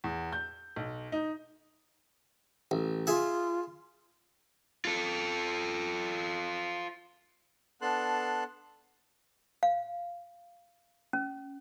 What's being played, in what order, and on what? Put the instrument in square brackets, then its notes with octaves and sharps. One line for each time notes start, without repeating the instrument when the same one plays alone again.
[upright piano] E2
G6
B1
D#4
[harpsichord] A1
[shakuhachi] F4 [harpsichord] G#4 E5
[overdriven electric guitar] F4 A4
[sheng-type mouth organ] B3 D4 A4 A5 C6 F#6
[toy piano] F5
C#4